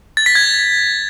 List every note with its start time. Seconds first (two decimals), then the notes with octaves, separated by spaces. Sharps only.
0.17 A6
0.26 B6
0.35 G#6